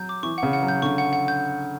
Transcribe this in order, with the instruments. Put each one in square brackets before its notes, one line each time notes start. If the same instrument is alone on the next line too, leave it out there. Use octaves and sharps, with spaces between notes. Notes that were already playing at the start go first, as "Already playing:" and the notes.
Already playing: [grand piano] F#3 [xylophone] G6
[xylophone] D6
[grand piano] E3 [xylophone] C#6
[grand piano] C#3 [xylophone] F#5
[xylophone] F#5
[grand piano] F#3
[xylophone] G6
[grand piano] D3 [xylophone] C#6
[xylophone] F#5
F#5
G6